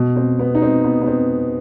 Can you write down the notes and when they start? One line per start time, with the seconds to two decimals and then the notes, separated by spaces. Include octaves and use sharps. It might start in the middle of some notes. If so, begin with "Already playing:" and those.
Already playing: B2
0.16 C4
0.39 B3
0.55 D#4
0.62 C4
0.84 B3
1.02 B3
1.07 C4